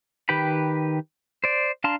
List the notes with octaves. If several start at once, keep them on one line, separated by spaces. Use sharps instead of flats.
D#3 G4 B4 G5 B5
C5 D5
D4 F5 A5 A#5 C6